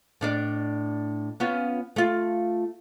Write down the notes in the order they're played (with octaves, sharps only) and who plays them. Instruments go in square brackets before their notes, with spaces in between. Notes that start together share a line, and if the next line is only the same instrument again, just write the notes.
[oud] A2 D4 D5
B3 C#4 F4
A3 F4